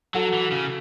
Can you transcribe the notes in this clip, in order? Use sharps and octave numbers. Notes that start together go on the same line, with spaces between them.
F#3 F#4 A4
E3
C#3